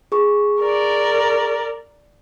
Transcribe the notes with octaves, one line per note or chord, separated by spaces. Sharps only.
G#4 C#6
A#4 D5